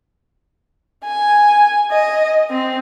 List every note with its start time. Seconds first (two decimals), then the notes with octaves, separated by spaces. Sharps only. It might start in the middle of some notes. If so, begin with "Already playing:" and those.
1.05 G#5
1.91 D#5
2.50 C4